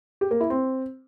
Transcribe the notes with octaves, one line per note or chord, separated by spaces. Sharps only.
G4
A#3
E4
C4